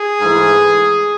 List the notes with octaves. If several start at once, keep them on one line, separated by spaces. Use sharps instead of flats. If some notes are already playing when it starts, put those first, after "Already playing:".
Already playing: G#4
G#2 E3 A3